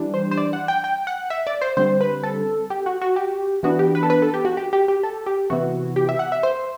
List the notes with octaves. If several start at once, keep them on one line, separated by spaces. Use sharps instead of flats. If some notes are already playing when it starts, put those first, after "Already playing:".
Already playing: E3 G3 D4
C5
C5
D5
F#5
G5
G5
F#5
E5
D5
C5
D3 G3 C4 C5
B4
A4
G4
F#4
F#4
G4
E3 B3 D4 F#4
G4
B4
A4
B4
A4
G4
F#4
G4
G4
G4
A4
G4
C3 E3 B3 E4 F#4
G4
E5
F#5
E5
C5